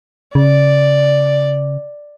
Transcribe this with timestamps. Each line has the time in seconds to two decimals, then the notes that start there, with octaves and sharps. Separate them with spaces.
0.35 C#3 D5